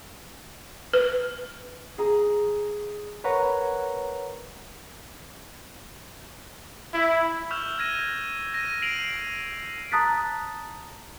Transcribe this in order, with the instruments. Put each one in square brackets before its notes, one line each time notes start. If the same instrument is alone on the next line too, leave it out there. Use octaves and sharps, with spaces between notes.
[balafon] B4
[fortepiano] G#4 A#5
[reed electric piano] A#4 B4 C#5 F#5 A#5
[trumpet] E4
[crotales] C#6 E6 F6 G6 E7 F7
F6 G#6 A#6 D#7
A#6 D#7
C7 D7 D#7 F7 F#7
[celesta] A5 A#5 D#6 F#6 A6 B6